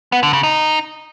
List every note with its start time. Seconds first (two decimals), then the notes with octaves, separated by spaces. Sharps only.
0.12 B3
0.23 D3
0.33 C#3
0.43 D#4